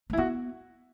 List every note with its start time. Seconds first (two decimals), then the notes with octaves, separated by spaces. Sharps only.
0.10 A3
0.13 E4
0.17 B3 F#4